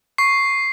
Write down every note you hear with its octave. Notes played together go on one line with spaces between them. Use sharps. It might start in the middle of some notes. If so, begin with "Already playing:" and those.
C#6 C7